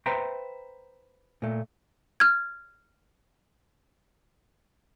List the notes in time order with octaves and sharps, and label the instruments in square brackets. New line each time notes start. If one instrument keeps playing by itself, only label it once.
[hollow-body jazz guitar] B4 C5 E5 G5 A#5 C6
A#2 A3
[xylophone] F6 G#6